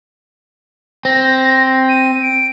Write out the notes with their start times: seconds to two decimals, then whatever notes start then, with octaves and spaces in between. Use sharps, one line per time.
1.05 C4 A#6
1.89 D#7
2.23 D7